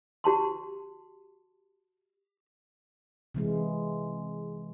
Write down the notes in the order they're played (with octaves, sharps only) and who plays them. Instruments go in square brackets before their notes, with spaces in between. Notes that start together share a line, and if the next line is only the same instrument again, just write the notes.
[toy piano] F#4 G4 A5 C6
[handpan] C3 E3 G#3